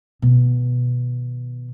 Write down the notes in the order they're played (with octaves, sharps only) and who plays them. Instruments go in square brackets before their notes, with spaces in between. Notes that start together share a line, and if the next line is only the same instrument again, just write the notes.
[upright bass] B2 D#3